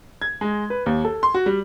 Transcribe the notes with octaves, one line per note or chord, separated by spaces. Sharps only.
G#6
G#3
B4
D#2
A4
C6
F#4
G3